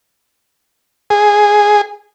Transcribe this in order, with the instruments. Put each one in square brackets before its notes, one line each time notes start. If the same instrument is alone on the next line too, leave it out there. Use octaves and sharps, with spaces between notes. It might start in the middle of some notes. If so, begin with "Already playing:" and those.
[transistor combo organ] G#4